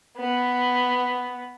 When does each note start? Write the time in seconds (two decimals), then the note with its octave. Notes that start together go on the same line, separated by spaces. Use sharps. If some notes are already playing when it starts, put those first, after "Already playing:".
0.17 B3